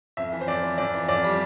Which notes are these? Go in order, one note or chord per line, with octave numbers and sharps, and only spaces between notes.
F2 E5
E3
C5
F2 D5
E3
F2 D5
E3
F2 D5
G3